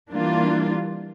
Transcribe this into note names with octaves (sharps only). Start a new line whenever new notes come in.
E3 G3 A#3 D4 F4